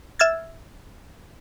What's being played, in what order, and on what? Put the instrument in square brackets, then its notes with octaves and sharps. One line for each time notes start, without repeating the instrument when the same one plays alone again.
[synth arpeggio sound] E5 E6 F6 G#6 A6